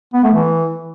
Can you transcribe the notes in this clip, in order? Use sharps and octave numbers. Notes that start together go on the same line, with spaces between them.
B3
A3
E3